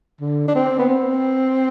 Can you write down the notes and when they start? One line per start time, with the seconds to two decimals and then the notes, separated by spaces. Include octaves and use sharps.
0.20 D3
0.48 D4
0.55 C4
0.79 B3
0.90 C4